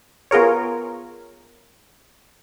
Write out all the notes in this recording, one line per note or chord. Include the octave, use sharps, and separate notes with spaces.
B3 F4 G#4 A#4 C#5